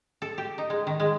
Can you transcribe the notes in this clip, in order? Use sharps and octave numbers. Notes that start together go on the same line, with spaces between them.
A4
G4
D#4
G#3
D#3
G#3